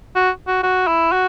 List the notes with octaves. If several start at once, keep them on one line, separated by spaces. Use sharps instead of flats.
F#4
F#4
F#4
E4
F#4